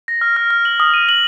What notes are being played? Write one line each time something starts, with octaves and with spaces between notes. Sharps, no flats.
A#6
F6
F6
F6
F#7
D#6
D#7
F#7